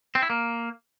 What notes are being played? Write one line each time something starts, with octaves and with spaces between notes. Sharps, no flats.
C4
E4
A#3